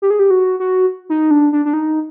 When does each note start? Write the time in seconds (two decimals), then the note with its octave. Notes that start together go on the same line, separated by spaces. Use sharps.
0.02 G4
0.10 G#4
0.19 G4
0.30 F#4
0.60 F#4
1.10 D#4
1.31 D4
1.53 D4
1.65 D4
1.73 D#4